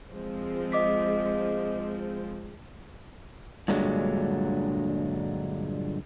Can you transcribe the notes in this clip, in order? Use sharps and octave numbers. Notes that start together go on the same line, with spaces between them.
F3 G#3 C4
D#5 D6 B6
G2 A#2 D3 F#3 G#3